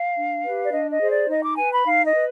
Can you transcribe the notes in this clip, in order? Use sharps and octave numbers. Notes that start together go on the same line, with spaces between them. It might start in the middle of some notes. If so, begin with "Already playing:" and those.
Already playing: F5
D4
G4 B4
D5
D4 D#5
D#5
G#4 C5
D5
D#4 D#5
D6
B4 G#5
B5
D#4 F5
D#5
B4